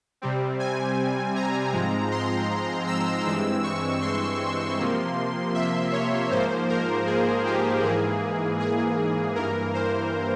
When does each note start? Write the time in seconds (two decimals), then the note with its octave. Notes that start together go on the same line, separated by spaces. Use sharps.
0.22 C3 G3 C4
0.59 G#5
1.36 A#5
1.73 G#2 F3 G#3 C4
2.12 C6
2.87 E6
3.26 G2 E3 G#3 C4 E6
3.64 C#6
4.02 C6
4.79 C3 F3 A#3
5.55 E5
5.92 C#5
6.31 G#2 F3 A#3 C5
6.69 A#4
7.07 G#4
7.46 G4
7.83 G#2 E3 A#3 G#4
8.60 G#4
9.35 G2 E3 A#3 A#4
9.74 C5